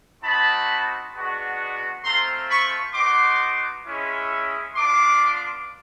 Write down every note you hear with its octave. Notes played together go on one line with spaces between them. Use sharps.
C4 D#4 F#4 A5 B5
G#3 B3 D4 F#4
A3 C4 F4 A#5 C6
B5 C#6
B3 D#4 F#4 C6 D6
G#3 C#4 E4
B3 D4 F4 C6 D6